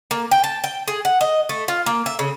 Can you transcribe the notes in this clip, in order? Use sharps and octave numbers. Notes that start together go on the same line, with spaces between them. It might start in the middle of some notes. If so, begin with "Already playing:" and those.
A#3
G5
A5
G5
G#4
F#5
D#5
A3
F4
A#3
E5
C#3